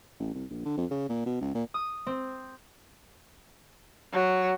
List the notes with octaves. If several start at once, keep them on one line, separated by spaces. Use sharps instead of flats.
A1
C2
A#1
D3
F2
C#3
A#2
B2
C#2
A#2
D#6
C4
F#3